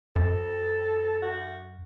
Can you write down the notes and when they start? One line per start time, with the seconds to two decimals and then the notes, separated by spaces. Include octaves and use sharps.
0.16 F#2 A4
1.22 F#4